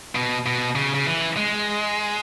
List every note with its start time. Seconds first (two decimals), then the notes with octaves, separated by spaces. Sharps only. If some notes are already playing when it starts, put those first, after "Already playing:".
0.15 B2
0.46 B2
0.76 C#3
0.94 C#3
1.07 E3
1.37 G#3